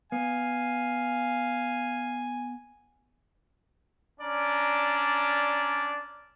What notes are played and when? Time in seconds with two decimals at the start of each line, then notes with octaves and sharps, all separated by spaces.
0.12 B3 F5 G#5
4.20 C#4 D4 D5 A#5